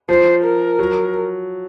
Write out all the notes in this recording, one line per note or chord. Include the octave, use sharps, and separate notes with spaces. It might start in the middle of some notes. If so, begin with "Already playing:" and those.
F3 C5
A#4
F#3